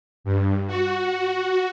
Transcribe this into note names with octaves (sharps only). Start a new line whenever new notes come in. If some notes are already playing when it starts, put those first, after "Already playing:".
G2
F#4